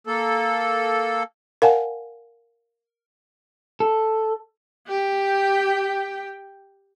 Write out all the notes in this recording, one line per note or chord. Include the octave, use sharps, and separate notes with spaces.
A#3 A4
A#4 D5 F5 F#5 G#5 A5
A4
G4 G5